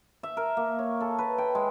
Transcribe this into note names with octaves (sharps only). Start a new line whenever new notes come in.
E5
A#4
A#3
C#5
A4
B4
G5
G#3